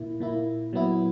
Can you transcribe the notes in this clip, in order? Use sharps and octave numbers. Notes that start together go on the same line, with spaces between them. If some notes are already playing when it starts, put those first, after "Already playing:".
Already playing: A#2 A#3 E4
A#2 A#3 E4
A#2 F#3 B3 E4